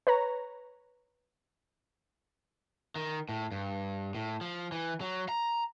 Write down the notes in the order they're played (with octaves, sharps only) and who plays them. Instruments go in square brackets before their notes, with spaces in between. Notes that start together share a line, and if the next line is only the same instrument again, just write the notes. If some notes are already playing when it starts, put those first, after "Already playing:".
[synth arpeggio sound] B4 C#5 A#5
[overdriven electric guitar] D#3
A2
G2
A2
F3
E3
F#3
A#5